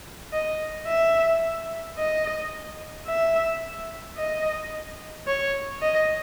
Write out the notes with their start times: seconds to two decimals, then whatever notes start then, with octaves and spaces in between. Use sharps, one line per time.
0.33 D#5
0.87 E5
1.98 D#5
3.07 E5
4.17 D#5
5.27 C#5
5.82 D#5